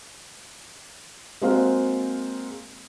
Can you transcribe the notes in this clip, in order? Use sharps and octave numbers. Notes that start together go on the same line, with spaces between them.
G#3 A#3 C4 F#4 C5 F5